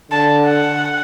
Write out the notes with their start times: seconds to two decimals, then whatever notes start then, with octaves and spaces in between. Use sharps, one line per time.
0.11 D3 A5
0.47 F#5